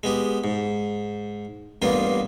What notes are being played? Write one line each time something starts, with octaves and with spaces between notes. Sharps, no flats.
G#3 B3 G4
G#2
A1 G2 A#3 B3 F4